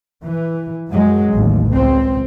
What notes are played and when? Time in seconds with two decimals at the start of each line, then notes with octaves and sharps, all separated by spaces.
0.24 E3
0.90 F#2 F#3 G#3
1.33 A1 D#2
1.73 C#2 C4